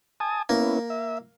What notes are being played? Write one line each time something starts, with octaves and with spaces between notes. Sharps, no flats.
G#5 A5 D#6
A#3 B3 C#4 E4
E5